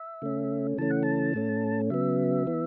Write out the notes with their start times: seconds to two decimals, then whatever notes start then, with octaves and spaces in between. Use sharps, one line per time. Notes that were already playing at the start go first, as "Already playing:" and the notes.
Already playing: E5
0.22 C#3 A3 C#4
0.78 C#3 E3 A3 C#4 A5
0.90 F#5
1.03 A5
1.34 A2 A3 C#4
1.90 C#3 F#3 B3 E5
2.47 E3 B3